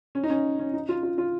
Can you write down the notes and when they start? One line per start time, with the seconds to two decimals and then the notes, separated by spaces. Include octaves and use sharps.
0.15 C#4
0.24 D#4
0.30 C#4
0.59 C#4
0.74 D#4
0.89 F4
1.03 F4
1.18 F4